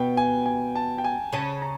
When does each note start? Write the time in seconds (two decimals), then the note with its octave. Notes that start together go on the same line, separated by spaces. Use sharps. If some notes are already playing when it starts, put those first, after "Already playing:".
Already playing: B2 B3 G5
0.17 G#5
0.46 G#5
0.75 A5
0.98 G5
1.04 G#5
1.33 C#3 C#4 A5
1.62 A#5